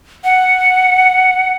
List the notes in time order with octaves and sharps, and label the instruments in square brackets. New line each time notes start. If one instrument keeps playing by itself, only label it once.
[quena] F#5